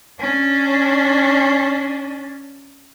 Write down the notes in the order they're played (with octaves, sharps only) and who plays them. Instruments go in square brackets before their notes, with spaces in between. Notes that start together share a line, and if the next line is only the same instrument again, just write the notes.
[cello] C#4 D4